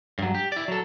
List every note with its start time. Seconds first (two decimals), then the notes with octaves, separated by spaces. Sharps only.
0.19 G2 F#3
0.35 G4
0.52 E4 D5
0.68 F#3 A4